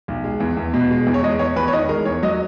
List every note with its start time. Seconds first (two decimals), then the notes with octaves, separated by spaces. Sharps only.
0.08 B1
0.24 G#3
0.40 E2
0.57 E2
0.74 B2
0.91 G#3
1.07 E2
1.14 C#5
1.23 G#3 D#5
1.39 E2 C#5
1.56 E2 B4
1.68 C#5
1.73 D#3 D#5
1.89 G#3 A#4
2.05 E2 C#5
2.23 F#3 D#5